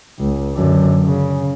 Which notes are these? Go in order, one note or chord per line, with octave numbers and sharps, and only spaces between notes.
C#2
F#2 D3
C#3